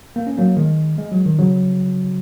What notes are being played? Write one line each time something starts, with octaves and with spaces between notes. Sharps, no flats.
A#3
C#4
F#3 A#3
D#3 G#3
G#3
F#3
D#3
C#3 F#3